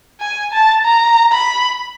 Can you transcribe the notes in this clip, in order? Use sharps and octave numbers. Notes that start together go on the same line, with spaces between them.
G#5
A5
A#5
B5